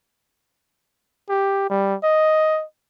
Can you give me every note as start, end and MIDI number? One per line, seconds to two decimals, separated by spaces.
1.29 1.69 67
1.70 1.95 55
2.03 2.64 75